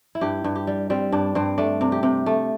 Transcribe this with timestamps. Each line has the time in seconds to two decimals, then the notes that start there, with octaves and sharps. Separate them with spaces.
0.15 E4
0.21 G2 G4
0.44 G2
0.56 G4
0.67 G3
0.90 G3 C4
1.12 G2 D4
1.35 G2 C4
1.58 A3 D4
1.81 C3
1.92 G4
2.03 C3
2.26 A3